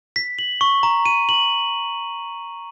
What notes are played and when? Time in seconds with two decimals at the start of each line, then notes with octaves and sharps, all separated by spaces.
0.16 B6
0.39 F#7
0.61 C#6
0.83 A#5
1.06 D#7
1.29 F#7